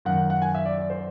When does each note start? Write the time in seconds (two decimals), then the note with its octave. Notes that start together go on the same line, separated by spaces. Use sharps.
0.05 F#2 D#3 F#5
0.30 F#5
0.42 G#5
0.55 E5
0.65 D5
0.78 D5
0.90 C5